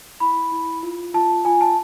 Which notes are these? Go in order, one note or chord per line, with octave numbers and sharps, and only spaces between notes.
E4 B5
E4
F4
F4 A5
F4 G#5
A5